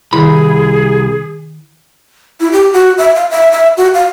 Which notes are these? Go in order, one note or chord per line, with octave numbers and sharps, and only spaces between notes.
C2 D#3 E4 G#4 B5
E4
G4
F#4
E5
F5
E5
E5
F#4
F5